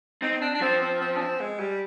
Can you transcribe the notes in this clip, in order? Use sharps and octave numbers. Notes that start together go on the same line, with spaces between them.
C4 D#4
D4
D4
F3 C4
C4
C4
D4
C4
G#3
G3